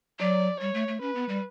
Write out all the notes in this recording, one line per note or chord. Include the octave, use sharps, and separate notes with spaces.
F#3 D5
G3 C#5
A3
A3
C#4 B4
B3
G3